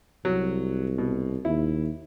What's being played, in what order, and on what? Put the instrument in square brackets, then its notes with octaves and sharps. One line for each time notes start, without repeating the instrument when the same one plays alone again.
[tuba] C2 [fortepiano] F#3
[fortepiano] B2
[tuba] D#2 [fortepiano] E4